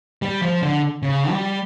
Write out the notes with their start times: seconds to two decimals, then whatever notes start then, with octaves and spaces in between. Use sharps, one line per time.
0.22 G3
0.42 F3
0.62 D3
1.03 C#3
1.30 G3